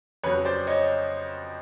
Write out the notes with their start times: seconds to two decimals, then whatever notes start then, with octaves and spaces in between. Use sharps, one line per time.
0.23 F2 C#3 F#3 B4 C#5
0.45 C5 D5
0.67 C#5 D#5